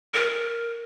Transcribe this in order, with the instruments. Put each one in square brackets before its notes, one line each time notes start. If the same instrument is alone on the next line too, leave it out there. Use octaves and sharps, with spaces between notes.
[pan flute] A#4